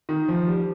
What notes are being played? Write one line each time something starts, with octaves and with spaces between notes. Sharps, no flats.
D#3
F3
G3